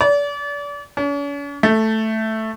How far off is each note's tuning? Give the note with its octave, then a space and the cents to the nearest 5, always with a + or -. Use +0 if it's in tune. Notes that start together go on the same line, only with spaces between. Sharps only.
D5 -35
C#4 +45
A3 +0